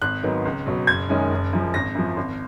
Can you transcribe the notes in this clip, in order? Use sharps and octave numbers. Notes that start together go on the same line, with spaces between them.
G#1 F#6
G#2 D#3 F#3 B3
C#2
B2 F#3
F#1 G#6
F#2 D#3 G#3 C#4
F#1
F#2 F3
G#1 A#6
F#2 F3
G#1